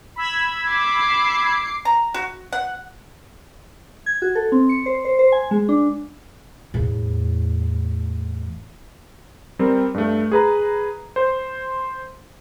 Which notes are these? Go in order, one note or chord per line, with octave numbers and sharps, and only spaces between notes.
B5 E6 G#6
D6 C7
A#5
F#4
F#5
G#6
F#4
A4
C4
C#7
C5
C5
C5
G#5
G#3
D4
E2 A2
G3 C4 A#4
G2 A3
G#4 B4 A#5
C5